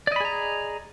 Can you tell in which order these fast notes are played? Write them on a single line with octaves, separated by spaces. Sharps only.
D5 D#5 B5 G#4 A#5